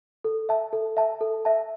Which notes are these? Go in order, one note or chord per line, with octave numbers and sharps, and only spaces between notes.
A4
E5 A5
A4
E5 A5
A4
E5 A5